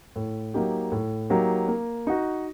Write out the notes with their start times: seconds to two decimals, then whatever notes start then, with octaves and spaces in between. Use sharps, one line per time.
0.16 A2
0.54 F#3 A#3 D#4 G4
0.92 A2
1.30 F#3 A#3 D#4 G4
1.68 A#3
2.07 D#4 F#4